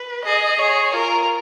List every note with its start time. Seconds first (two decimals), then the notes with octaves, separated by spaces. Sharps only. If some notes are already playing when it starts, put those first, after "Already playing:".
Already playing: B4
0.25 G#4 D#5
0.59 G#4 C#5
0.93 F4 A#4